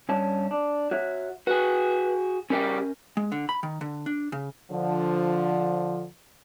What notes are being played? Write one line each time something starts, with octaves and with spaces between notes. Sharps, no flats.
G2 C#4 A5
D4
F#4 C#5 E5
F#4 G#4 B4
C#3 G3 C#4 G4 A#4 G#5
G#3
D3
B5
D#3
D3
D4
C#3
D3 F3